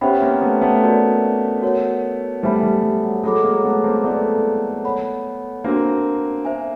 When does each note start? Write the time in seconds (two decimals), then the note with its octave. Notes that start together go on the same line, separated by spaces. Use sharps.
0.01 B3 C#4 G4 C5 E5 G5 B5
0.22 A#3 C4
0.42 A3 B3
0.61 A3 B3
0.83 F#4 A#4 D5
1.62 F#4 A#4 C#5 F#5
2.43 G3 A3 C5 E5 G#5 B5
2.63 G3
2.83 G3
3.03 F#3
3.23 F#3 G#3 A4 C#5 F#5 B5 D6
3.43 G#3 A#3
3.64 A3 B3
3.84 A#3 C4
4.04 A3 B3 E4 A4 D5 F#5
4.84 C#5 F#5 B5
5.64 A#3 C4 D4 F#4 A#4
6.45 C5 E5 G#5